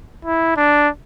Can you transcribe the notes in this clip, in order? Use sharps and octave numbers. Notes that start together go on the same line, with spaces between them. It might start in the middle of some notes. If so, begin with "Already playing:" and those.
E4
D4